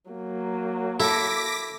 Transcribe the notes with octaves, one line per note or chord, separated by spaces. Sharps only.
F#3 A#3
E4 A4 D6 A#6 B6